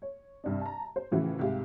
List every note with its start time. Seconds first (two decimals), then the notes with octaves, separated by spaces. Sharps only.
0.02 C#5
0.44 C2 G2 D4
0.61 A5 A#5
0.96 C5
1.11 A2 C#3 E3 F3 E4 F#4
1.39 C2 G#2 G4 F5